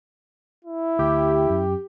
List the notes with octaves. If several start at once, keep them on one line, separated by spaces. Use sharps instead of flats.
E4
D2 G4
F#2